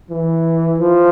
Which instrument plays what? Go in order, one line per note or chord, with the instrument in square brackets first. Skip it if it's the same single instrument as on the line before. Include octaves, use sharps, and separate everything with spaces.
[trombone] E3
F3